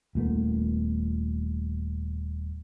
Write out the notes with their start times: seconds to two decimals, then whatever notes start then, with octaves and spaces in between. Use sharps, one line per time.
0.15 D#1 A#2 A3 B3